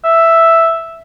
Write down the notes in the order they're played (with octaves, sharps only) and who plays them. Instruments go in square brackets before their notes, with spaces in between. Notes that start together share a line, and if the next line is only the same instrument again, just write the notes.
[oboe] E5